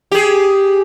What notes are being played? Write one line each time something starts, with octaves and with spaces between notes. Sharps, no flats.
G4 G#4